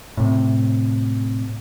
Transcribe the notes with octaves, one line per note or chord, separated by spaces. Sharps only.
A2 C3